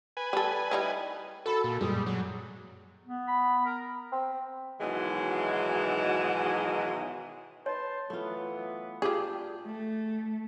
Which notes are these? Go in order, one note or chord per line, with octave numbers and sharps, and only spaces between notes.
B4 G#5
G3 A4
G3 D#4 E4
F#4 A4 B5
A#2
F#2 A#2 G3 G#3 D#6
F#3
B3
B5
A#4
C4
G#2 B2 D#3 E3 F#3 G#3
B4 C#5 A5 C6
E3 F#3 A3 B3 F4
D4 F4 G4 G#4
A3